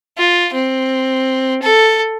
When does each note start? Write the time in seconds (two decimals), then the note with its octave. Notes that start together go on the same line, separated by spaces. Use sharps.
0.18 F4
0.53 C4
1.62 A4